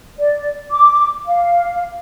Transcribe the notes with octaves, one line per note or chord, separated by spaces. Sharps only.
D5
D6
F5